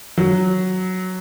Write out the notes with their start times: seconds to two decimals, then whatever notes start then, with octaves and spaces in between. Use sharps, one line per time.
0.18 F#3